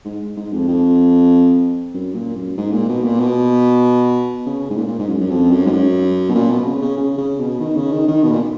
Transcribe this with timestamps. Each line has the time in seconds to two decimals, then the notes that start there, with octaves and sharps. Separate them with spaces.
0.05 G#2
0.37 G#2
0.52 F2
0.68 F2
1.94 F#2
2.15 A#2
2.36 F#2
2.58 G#2
2.73 A#2
2.89 B2
3.04 A#2
3.20 B2
4.46 C#3
4.70 G#2
4.77 A#2
4.88 A#2
4.99 G#2
5.09 F#2
5.21 F#2
5.30 F2
5.51 F#2
5.66 G#2
5.72 F#2
6.30 B2
6.35 A#2
6.51 B2
6.66 C#3
6.82 C#3
6.97 C#3
7.18 C#3
7.40 B2
7.60 D#3
7.76 C#3
7.92 D#3
8.08 D#3
8.24 B2
8.31 A#2